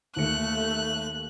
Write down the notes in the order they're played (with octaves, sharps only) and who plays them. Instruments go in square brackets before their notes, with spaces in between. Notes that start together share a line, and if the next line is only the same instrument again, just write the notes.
[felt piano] D#2 C#7 [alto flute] A3 [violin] F#6